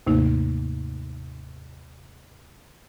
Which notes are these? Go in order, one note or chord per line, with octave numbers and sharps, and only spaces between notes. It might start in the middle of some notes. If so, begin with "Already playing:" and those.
D#2 G#2 C3 A3 A#3 D#4